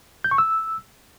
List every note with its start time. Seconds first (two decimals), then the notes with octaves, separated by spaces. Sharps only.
0.24 G6
0.31 C#6
0.38 E6